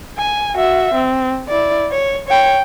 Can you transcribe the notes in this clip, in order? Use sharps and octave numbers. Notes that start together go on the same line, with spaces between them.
G#5
F#4 E5
C4
E4 D5
C#5
C#5 G5